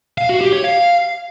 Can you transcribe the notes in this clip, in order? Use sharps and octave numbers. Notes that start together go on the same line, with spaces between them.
F5
F#4
G4
C#5
F5